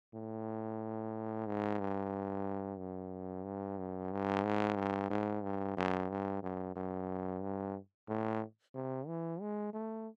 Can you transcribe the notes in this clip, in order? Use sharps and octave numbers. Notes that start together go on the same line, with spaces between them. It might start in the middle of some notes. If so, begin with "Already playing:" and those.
A2
G#2
G2
F#2
G2
F#2
G2
G#2
G2
G#2
G2
F#2
G2
F#2
F#2
G2
A2
C3
E3
G#3
A3